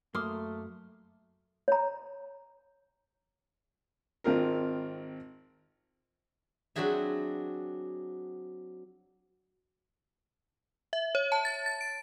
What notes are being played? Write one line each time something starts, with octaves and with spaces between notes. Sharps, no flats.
F#2 A3 A#3 C6 D6 D#6 F6
C#5 A#5
G#1 C4 F4 A#4
F#3 C4 D4 F#4 G#4 E5
E5
C#5
A5
A6
A6
D7